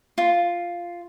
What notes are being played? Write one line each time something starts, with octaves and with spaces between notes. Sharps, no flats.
F4